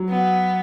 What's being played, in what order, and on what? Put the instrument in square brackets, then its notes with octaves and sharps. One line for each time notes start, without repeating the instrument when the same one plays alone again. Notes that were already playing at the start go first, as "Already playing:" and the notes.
Already playing: [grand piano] F#3
[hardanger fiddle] B3